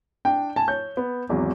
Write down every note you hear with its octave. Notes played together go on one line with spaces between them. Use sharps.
D4 G5
G#5 A5
C#5 G6
B3
G#1 E2 F#3